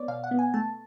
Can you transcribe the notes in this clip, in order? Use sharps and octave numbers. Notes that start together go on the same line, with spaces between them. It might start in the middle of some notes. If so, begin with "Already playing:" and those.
Already playing: B3 C#5 D5
B2 F5
F#5
B3
G#5
A3 A5